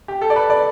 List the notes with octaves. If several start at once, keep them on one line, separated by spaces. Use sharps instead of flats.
G4
A4
D5
B4
D5